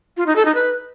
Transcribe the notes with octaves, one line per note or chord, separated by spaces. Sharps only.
F4
D#4
A4
D#4
B4